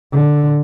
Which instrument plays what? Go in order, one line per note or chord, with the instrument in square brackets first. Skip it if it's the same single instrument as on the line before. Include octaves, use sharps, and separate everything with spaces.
[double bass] D3